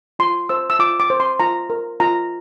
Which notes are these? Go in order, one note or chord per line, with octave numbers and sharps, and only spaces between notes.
F4 C6
C5 E6
E6
F4 D6
D6
C5
C6
F4 A#5
A#4
F4 A#5